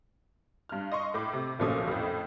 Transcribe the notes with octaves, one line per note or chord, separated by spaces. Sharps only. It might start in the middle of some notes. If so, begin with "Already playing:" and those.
G2 F6
D#5 C6 C#6
A2 D6
C3
B1 A#2 F3 A3 C#4 D#6
F2 A2